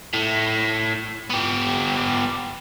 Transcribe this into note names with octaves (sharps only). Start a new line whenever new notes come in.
A2
B3 G4